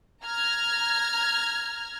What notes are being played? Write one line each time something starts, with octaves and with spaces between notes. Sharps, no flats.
A#5 F6 G#6